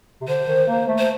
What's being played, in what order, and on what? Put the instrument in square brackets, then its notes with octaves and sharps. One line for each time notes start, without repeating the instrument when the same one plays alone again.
[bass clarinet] C3
[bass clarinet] D3 [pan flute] C5
[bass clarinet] D#3
A#3
A3
[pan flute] C5